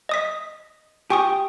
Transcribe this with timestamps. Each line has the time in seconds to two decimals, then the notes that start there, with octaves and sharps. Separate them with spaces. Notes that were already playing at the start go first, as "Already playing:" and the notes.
0.09 D#5 D#6 B6
1.10 G4 G#5 C#6 D#6